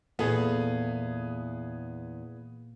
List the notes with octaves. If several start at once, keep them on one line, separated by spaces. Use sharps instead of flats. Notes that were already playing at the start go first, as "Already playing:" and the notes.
E2 A#2 A#3 B3 E4 G#4 A4